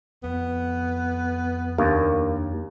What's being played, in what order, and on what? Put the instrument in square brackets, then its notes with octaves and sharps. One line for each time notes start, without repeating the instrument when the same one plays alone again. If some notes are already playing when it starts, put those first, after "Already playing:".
[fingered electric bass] F2 [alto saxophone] B3
[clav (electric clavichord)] D#2 [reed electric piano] D4 A#4 F5